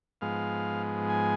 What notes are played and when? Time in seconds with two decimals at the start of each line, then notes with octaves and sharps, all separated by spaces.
0.21 G#2 F3 G#3 B3 F5
1.09 G#5